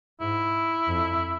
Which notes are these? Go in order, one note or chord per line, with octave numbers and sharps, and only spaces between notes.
G#2 E4
F2